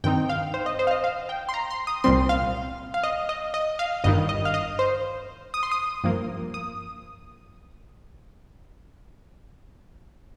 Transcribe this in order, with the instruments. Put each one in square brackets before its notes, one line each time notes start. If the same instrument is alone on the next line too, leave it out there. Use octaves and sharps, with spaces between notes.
[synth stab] G2 D#3 C4 D#4 G5
F5
C5
D#5
C5
F5
D#5
F5
G5
C6
A#5
C6
D#6
C2 A#2 G3 C4 C6
F5
F5
D#5
D#5
D#5
F5
G1 G2 D#3 D#5
D#5
F5
D#5
C5
D#6
C6
D#6
G2 F3 A#3
D#6